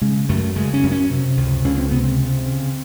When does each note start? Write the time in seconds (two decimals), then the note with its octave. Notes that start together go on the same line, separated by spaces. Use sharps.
0.01 C#3 G#3
0.29 F#2 A3
0.56 C#3 G#3
0.74 C#4
0.83 F#2
0.92 C#4
1.10 C3
1.37 C#2
1.64 C#2 C#4
1.78 C4
1.91 C3 B3
2.04 C4
2.18 C#3
2.45 C#3